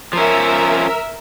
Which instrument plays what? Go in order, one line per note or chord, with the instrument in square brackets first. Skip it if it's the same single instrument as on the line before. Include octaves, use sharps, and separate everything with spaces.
[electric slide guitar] F3 C#4 [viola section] A#4 E5